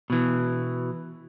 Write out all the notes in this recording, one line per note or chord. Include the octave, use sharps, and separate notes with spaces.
B2 E3